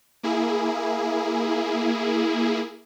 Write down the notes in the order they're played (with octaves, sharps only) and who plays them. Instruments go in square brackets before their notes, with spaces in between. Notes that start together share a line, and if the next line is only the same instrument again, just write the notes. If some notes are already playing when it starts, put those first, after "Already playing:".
[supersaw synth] A#3 E4 G#4